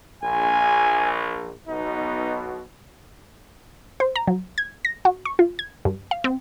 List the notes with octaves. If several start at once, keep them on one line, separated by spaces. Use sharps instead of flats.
A#1 G#5
B1 B2 D#4
C5
A#5
F#3
G#6
A#6
F#4
C#6
F4
G#6
G2
F5
C4